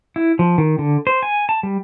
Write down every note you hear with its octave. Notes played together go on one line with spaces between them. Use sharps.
E4
F3
D#3
D3
C5
G#5
A5
G3